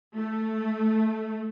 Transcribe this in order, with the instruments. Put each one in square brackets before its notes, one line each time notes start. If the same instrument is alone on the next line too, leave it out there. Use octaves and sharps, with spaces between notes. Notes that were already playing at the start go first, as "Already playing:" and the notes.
[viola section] A3